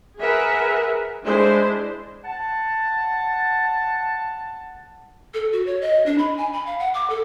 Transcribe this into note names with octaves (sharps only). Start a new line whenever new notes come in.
G#4 A#4 B4 E5 F#5
G#3 D4 E4 C5
F#5 A5
A4
F#4
C#5
D#5
D4
B5
G#5
B5
F5
F#5
D6
A4